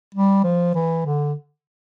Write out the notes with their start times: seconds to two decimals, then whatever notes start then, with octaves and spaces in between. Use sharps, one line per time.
0.15 G3
0.44 F3
0.74 E3
1.05 D3